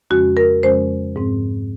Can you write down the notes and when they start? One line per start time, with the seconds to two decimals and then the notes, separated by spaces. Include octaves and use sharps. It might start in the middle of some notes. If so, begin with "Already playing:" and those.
0.10 F2 C#3 F3 G#3 C#4 F#4
0.37 A#4
0.63 F2 C#3 F3 G#3 C#4 C5
1.16 G#2 F3 C4